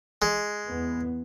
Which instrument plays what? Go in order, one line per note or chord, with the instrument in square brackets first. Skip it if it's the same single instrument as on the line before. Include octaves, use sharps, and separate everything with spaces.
[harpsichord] G#3
[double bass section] E2 B3